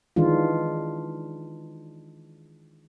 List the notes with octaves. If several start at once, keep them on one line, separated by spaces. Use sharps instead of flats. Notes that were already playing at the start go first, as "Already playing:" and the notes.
D#3 E3 G#3 D4 F4